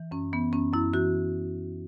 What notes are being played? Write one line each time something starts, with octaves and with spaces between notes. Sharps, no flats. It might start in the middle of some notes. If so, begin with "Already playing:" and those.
Already playing: E3
F#2 C#4
E3 B3
F#2 C#4
F#2 E4
E3 F#4